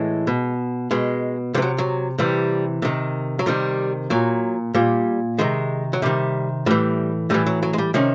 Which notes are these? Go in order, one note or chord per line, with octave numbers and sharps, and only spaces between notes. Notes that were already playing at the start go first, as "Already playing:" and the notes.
Already playing: A2 E3 G#3
B2
B2 G#3
C3 E3 G3
F#3
F#3
C3 E3 G3
C3 D#3
F#3
C3 D#3 G3
A#2 F#3
A#2 G3
C3 D#3 G#3
F#3
C3 D#3 G3
A2 E3 G3
A2 E3 G3
F#3
F#3
G#3
G3
C3 D#3 C#4